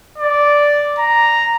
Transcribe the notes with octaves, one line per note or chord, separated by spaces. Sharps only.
D5
A#5